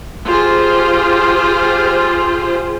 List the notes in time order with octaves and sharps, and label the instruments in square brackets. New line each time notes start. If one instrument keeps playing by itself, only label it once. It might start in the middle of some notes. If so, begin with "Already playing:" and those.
[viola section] F4 G4 G#4 C5